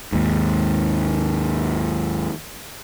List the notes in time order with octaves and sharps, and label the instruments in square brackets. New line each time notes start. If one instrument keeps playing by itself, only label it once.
[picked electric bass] D#2 G#2